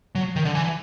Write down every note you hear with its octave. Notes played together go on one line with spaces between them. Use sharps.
F#3
D#3
D3
E3